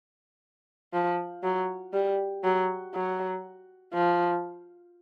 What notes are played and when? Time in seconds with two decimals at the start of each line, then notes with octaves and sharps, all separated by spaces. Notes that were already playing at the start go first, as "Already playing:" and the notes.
0.93 F3
1.44 F#3
1.94 G3
2.44 F#3
2.94 F#3
3.94 F3